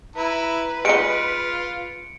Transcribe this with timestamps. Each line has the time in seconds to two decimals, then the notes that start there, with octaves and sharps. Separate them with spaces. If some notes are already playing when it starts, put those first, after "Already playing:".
0.16 E4 B4 A#5
0.85 G#3 D#4 F4 C#7 D7